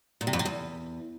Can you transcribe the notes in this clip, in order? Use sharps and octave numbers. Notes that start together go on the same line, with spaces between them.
A#2
C3
F2
C3
E2